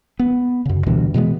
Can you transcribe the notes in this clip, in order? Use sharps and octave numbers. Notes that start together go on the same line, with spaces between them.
B3
F#2 C#3
D2 G2 B2 E3
B2 E3 G#3 B3